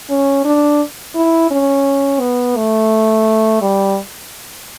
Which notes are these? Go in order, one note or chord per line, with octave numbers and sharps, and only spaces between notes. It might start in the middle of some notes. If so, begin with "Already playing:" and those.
C#4
D4
E4
C#4
B3
A3
G3